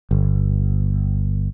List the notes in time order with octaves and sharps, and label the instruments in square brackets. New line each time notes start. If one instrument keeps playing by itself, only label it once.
[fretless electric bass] G1